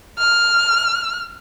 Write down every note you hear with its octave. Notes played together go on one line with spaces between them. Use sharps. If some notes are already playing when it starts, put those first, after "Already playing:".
F6